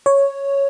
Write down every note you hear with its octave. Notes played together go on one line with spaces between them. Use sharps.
C#5